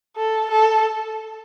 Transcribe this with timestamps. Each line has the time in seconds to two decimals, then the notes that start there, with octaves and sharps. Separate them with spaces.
0.16 A4
0.51 A4